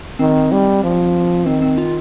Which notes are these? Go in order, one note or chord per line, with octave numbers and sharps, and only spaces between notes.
D#3 C4
G3
F3
D#3 C4
C4
F4